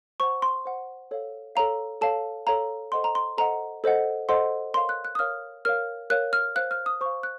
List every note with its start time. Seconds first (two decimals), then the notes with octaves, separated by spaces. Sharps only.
0.20 C5 F#5 C#6
0.42 C6
0.65 C5 F#5
1.11 A4 C#5 F5
1.55 A4 C#5 F5 A#5
2.01 A4 C#5 F5 A5
2.47 A4 C#5 F5 A#5
2.92 A4 C5 D#5 F#5 C6
3.04 A#5
3.15 C6
3.38 A4 C5 D#5 F#5 A#5
3.84 A4 C5 D#5 F#5
4.29 A4 C5 D#5 F#5 C6
4.74 A#4 C#5 F5 C6
4.89 F#6
5.05 F#6
5.15 D#6
5.19 A#4 C#5 F5 F6
5.65 A#4 C#5 F5 F6
6.10 A#4 C#5 F5 F#6
6.33 F6
6.56 C5 F5 F#6
6.71 F6
6.86 D#6
7.01 C5 F5 C#6
7.23 F#6